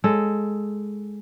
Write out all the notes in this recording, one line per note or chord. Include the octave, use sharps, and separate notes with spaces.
G#3 A4